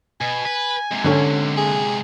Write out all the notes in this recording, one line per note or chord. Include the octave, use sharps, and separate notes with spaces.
B2 G#5
B4
G#2 C3
D3 C#4 A4
G#4